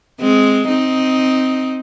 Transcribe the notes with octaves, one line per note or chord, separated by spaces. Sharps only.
G#3 C4
C4 D#4